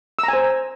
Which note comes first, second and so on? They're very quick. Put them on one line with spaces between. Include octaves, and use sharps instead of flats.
E6 A#5 G#5 C5